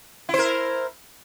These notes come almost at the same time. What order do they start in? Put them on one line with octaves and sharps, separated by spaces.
E4 C5 A#4